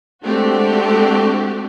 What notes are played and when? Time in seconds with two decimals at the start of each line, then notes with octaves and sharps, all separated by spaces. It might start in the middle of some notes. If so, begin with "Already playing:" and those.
0.23 G#3 A3 C4 D4 F#4 G4